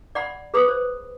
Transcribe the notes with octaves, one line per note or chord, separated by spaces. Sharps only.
D5 F#5 B5
G#4 B4 B5 D#6
C5